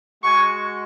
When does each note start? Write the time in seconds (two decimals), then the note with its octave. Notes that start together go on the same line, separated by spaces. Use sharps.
0.23 G#3 F#4 G#5 C#6